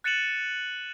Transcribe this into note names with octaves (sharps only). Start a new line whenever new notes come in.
F#6 A6 C#7 D#7 E7 F#7